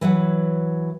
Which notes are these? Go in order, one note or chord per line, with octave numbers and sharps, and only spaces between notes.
E3 F#3 B4 F#5